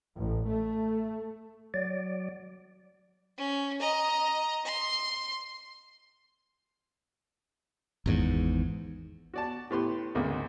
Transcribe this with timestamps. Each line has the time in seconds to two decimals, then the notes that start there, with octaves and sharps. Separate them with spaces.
0.18 A1
0.48 A3
1.74 F#3 D5
3.38 C#4
3.80 D#5 A#5
4.65 C6
8.06 G#1 E2 G#2
9.34 F#4 D5 A5
9.71 A2 B3 G4 B4 C6
10.15 G#1 D2 C#3 A#3 F#5